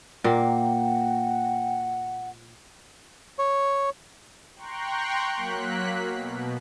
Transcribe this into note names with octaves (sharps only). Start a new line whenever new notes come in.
A#2 A#3 F#5 G5
C#5
G5 A#5 C6 C#6 F#6
F#3 A#3 F#6 B6
B2